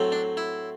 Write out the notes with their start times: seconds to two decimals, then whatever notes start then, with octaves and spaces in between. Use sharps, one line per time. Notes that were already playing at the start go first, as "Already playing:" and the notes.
Already playing: A2 F#3 A3 C4
0.12 D4
0.37 E4